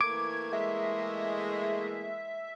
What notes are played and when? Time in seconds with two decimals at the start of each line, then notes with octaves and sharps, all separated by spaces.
0.01 E3 A3 A#3 D6 G#6
0.53 G#3 E5